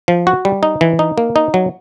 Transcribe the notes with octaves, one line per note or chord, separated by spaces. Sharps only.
F3
F#4
G3
D#4
E3
D#4
A#3
D#4
F#3